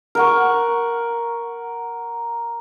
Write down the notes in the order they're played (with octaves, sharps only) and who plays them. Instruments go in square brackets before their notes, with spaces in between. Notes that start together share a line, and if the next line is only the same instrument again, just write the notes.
[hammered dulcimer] A#4 F#5 C#6